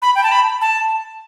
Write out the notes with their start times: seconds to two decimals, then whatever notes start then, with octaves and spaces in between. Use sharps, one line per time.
0.02 B5
0.15 G5
0.23 A5
0.32 B5
0.61 A5